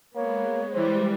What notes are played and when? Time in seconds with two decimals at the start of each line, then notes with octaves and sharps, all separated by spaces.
0.16 G#3 A#3 B3 C#5
0.73 E3 G3 C5